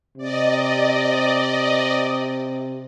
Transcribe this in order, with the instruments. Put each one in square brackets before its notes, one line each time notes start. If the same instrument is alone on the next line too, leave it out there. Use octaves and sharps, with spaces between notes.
[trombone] C3 [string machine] D5 D#5